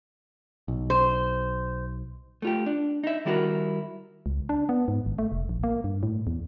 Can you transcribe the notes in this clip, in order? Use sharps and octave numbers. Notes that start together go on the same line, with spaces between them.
B1
C5
A3 F4 G4
D4
D#4 E5
D#3 G3 E4 F#4 G4 A#4
C#2
D4
B3
G#2
G#1
A3
F1
A#1
A#3
G2
A2
E2